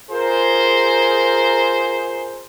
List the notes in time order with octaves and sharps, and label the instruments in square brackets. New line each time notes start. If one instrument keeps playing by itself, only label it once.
[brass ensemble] F4 G#4 A#4 C5